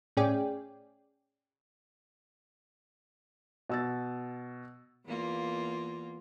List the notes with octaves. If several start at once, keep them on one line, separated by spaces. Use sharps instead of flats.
A2 C#4 G#4 D5 G5
B2 E6 A6
E2 A#3 F4